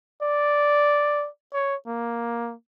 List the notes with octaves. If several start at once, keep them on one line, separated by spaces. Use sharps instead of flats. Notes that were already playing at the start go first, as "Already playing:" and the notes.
D5
C#5
A#3